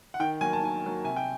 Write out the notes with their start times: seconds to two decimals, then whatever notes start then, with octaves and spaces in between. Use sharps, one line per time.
0.14 F#5
0.20 D#3 G5
0.41 F#3 A#3 G#5
0.53 A5
0.62 D#3 G#5
0.84 F#3 A#3
1.04 C3 G#5
1.16 G5